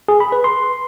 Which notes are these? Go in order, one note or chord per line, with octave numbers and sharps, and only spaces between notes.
G#4
B5
B4
C6